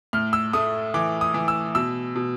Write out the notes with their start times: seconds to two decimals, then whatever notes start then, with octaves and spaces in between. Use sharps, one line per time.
0.13 A2 F6
0.33 E6
0.53 A3 D#6
0.94 E3 D6
1.21 D#6
1.34 E3
1.48 E6
1.75 B2 E6
2.15 B2